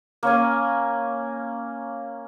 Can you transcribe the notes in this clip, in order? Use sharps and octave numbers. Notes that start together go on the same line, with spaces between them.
A#3 C#4 G#5